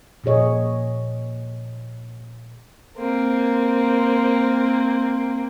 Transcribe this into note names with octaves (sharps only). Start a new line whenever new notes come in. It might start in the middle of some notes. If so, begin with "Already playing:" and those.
A#2 F3 G#4 C#5 D#5
A#3 C4